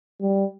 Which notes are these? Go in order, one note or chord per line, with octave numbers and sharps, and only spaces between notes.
G3